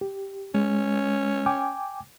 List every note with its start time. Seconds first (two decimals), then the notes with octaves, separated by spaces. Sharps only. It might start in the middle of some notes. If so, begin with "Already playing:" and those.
0.01 G4
0.54 G#3 C#4
1.46 G5 G#5 D6